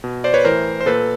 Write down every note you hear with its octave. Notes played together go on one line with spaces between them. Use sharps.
B2
C5 D5
B4 C#5
A2 E3 A#4 C5
C5
A#2 A4 B4